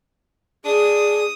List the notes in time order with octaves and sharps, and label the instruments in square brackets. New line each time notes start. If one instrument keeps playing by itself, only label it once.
[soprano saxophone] D4 [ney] G#4 [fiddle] D#6